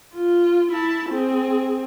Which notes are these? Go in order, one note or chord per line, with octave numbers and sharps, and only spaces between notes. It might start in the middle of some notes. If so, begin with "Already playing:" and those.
F4
E4 A5
C4 G#4